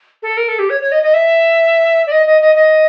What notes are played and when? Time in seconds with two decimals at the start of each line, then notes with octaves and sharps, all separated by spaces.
0.23 A4
0.37 A#4
0.48 A4
0.59 G4
0.70 C#5
0.81 C#5
0.92 D#5
1.03 D#5
1.14 E5
2.07 D5
2.12 D#5
2.26 D#5
2.41 D#5
2.55 D#5